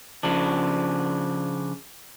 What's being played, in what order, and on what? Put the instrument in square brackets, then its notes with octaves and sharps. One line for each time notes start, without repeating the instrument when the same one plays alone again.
[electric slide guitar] C#3 F3 D4